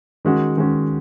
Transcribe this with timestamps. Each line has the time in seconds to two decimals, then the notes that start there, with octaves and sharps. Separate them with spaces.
0.25 D#3 G#3 C#4 F#4
0.57 D#3 G#3 C#4 F#4